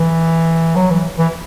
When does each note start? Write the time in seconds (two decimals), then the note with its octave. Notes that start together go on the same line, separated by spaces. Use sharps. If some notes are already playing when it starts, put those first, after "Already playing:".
Already playing: E3
0.76 F#3
0.91 E3
1.18 E3